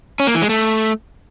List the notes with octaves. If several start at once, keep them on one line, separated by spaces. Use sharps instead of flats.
C#4
A#3
E3
G#3
A3